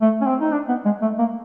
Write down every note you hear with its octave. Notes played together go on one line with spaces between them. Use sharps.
A3
C#4
C4
D#4
D4
B3
G#3
A3
A#3